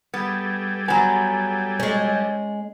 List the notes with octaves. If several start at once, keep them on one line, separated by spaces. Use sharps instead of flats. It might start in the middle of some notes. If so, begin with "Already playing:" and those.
G3 B3 G#4 A4
F#3 B3 G#5 A#5
G#3 C#4